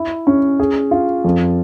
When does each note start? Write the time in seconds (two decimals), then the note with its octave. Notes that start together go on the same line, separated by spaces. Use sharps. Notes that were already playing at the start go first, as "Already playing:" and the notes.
Already playing: E4
0.27 C#4
0.60 G#4
0.91 F4
1.24 F2